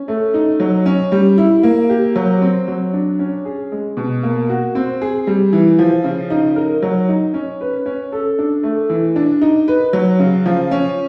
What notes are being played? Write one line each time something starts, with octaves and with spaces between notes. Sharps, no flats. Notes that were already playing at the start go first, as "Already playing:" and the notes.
Already playing: C#4
A3
D#4
F#3
C#4
G3
E4
A#3
G4
F#3
C4
F#3
D4
C#4
G#4
G#3
B2
A#3
F#4
C4
G#4
G3
E3
F3
C#3
D#4
A#4
F#3
D#4
C#4
B4
C#4
A4
D4
A3
E3
D4
D#4
B4
F#3
C#3
F3
C#4